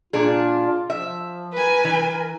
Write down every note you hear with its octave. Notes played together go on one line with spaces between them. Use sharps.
A#2 D4 F4 G#4
F3 E5
A#4 B4 G#5
E3